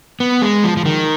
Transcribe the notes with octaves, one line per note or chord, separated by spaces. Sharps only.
B3
G#3
F3
F3
D#3